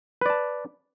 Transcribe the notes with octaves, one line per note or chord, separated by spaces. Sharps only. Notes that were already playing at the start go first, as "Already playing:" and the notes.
B4 D5 A5